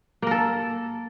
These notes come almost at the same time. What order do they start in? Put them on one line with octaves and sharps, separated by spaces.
A#3 A#4 A4